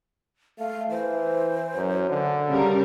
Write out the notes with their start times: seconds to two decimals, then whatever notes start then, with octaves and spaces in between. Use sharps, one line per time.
0.59 A3 F5
0.91 E3 C5
1.76 F#2
2.10 D3
2.49 C#3 G3 A#4